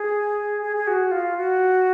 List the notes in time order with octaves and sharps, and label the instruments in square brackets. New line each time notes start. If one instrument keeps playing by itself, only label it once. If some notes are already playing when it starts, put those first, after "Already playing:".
Already playing: [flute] G#4
G#4
G#4
F#4
F4
F#4